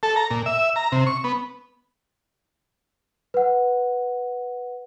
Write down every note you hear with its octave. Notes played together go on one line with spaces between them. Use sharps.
A4
A#5
A#2
E5
A#5
C3
C#6
B3
B4 F#5